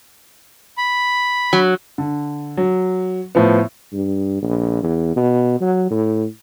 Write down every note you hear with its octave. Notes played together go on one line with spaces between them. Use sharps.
B5
F#3
D3
F#3
A2 F3 B3
G2
A#1
E2
B2
F#3
A2